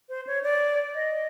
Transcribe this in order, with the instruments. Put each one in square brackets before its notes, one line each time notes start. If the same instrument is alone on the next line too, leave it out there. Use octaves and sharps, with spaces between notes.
[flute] C5
C#5
D5
D#5